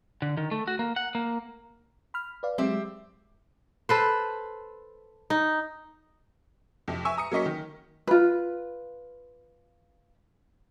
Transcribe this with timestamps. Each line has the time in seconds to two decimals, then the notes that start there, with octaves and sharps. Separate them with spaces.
0.22 D3
0.37 D#3
0.51 A3
0.67 F#4
0.79 A#3
0.96 F#5
1.15 A#3
2.14 B5 F6
2.43 B4 D5 F5
2.58 F#3 G#3 C4 G4 E5
3.89 A4 B4 C5
5.30 D#4
6.88 F2 C3
7.05 E5 G#5 C#6 E6
7.17 A#5 D#6 C#7
7.32 F#3 A#3 C#4 D#5 C#6 B6
7.46 D#3
8.07 F4 B4